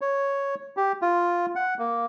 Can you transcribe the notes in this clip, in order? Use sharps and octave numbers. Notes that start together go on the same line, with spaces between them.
C#5
G4
F4
F#5
A#3